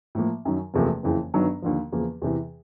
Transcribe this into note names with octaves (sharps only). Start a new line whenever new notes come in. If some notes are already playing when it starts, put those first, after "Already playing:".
A2 F3 A#3
F#2 D#3 F#3
F#1 E2 C3 F3 A3
F#1 F2 C#3 E3
G1 G2 D#3 F#3 B3
D#2 D3 F3
E2 C#3 F3 A#3
E2 C3 E3